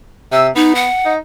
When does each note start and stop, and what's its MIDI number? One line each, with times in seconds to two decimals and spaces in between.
0.32 0.49 48
0.32 0.47 88
0.55 0.87 59
0.55 0.75 63
0.75 1.12 78
1.05 1.18 63